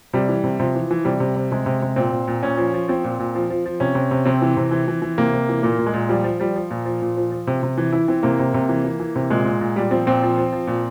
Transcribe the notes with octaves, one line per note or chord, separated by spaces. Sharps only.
C3 G3
E3
C3
C3 F3
E3
E3
C3 G3
C3
C3
C3 G#3
C3
C3
A#2 C4
A#2
A#2
A#2 C#4
F3
F3
F3 C4
A#2
A#2
F3
F3
F3
C3 C#4
C3
C3
C3 C4
E3
C3
E3
E3
E3
C3 A#3
C3
E3
A#2 A#3
A#2
G#3
A#2
F3 G3
F3
F3 G3
F3
A#2
F3
A#2
F3
F3
C3
C3
E3
E3 E4
E3 C4
C3 A#3
C3
C3
E3
E3
E3
C3
A#2 G#3
A#2
A#2
A#2 G3
F3 C4
A#2 C4
F3
F3
F3
A#2